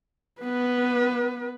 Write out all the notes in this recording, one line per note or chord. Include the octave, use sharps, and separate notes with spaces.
B3 B4